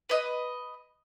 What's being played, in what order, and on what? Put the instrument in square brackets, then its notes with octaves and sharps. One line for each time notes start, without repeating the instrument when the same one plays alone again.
[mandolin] B4 D#5